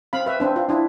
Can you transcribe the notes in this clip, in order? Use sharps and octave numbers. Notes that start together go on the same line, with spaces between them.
C4 F5 B5
B4 E5
C4 D4
F4
D4 E4